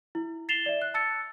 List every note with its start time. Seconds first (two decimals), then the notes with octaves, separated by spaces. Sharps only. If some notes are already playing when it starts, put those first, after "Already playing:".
0.15 E4
0.49 A6 C7 E7 F7 G7
0.66 D5 E5
0.82 F#6
0.94 A5 E6 A6 C#7